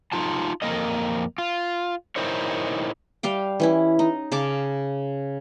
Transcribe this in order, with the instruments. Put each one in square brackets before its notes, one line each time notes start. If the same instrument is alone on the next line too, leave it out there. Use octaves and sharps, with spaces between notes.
[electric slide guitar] D#4 F4 A5
F2 A#3 A#4 D#5
F4
D#4 E4 A#4 C5 C#5
[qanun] G3 G4 F5 G5
E3 C#4 E4
D#4
C#3 F5 A5 D6